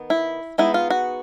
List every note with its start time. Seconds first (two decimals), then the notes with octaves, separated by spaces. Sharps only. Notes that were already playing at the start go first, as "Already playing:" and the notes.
Already playing: D#3 B3
0.10 E4
0.58 G#3 B3 D#4 E4
0.74 F4
0.90 F#4